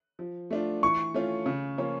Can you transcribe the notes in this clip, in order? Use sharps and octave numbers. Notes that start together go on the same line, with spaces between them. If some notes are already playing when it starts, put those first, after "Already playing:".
F3
A3 D4 F4
E3 C#6
A3 C#4 F4
C#3
F3 A#3 C#4 F4